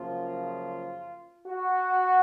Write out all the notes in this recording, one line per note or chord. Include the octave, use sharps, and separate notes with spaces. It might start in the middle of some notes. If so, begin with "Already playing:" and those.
Already playing: F#2 C#3 F3 A#3 F4
F#4